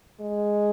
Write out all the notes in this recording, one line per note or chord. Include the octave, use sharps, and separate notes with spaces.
G#3